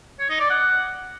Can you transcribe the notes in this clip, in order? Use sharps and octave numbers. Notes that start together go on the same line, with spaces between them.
C#5
D#4
D5
F#5